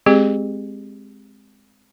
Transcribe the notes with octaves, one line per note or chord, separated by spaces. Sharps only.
G#3 C4 G4 G#4